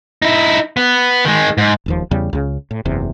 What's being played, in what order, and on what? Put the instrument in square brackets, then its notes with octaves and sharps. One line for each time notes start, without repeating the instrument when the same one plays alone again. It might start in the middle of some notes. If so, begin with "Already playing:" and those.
[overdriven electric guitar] D#4 E4
B3
D#3 G#3
G#2
[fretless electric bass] E1 D#2 F3
E2 C#3 G3
C#2 C#3
A2
F#1 E2 C3